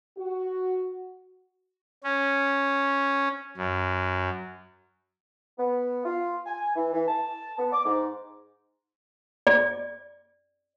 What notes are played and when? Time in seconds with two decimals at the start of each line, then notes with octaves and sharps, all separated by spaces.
0.18 F#4
2.04 C#4
3.57 F#2
5.58 B3
6.05 F4
6.46 G#5
6.76 E3
6.93 E3
7.08 A5
7.58 B3
7.72 D6
7.85 G#2
9.47 D5